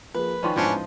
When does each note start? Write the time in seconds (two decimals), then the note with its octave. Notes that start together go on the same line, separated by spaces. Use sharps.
0.14 F3 A#3 G#4 B4
0.43 D#3 F3 C#4 D5 C6 C#6
0.56 A1 E2 G#2 F3 C#4 D4 C5 D#5